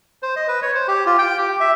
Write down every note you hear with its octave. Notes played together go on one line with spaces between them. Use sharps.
C5
D#5
B4
C#5
C5
G4
F4
G5
G4
E5